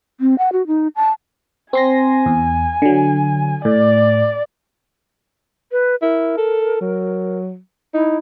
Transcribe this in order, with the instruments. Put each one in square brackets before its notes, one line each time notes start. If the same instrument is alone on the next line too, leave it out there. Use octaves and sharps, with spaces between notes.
[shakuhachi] C4
F#5
F#4
D#4
A5
[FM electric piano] C4 C6 A#6 [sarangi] G#5
[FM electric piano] E2
D3 F#3
[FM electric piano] A2 [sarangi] D5
[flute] B4
[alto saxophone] E4 [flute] A#4
[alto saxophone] A4
F#3
[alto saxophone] D#4 [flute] E4